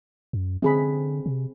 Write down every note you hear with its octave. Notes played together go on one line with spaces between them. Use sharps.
F#2
D3 C4 G#4 B5
C3